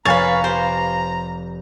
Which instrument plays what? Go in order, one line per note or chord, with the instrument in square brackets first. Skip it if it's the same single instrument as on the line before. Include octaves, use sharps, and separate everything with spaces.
[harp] F1 [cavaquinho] B4 C#5 [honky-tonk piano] F5 G#5 A6 [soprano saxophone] A#5
[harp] G4 B4 D6 [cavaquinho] C5